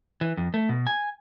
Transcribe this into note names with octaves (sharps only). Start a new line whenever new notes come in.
E3
F2
A3
B2
G#5